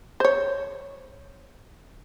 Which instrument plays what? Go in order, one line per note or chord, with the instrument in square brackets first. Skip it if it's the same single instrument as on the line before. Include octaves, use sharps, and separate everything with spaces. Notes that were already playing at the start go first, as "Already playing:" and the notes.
[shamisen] C5 C#5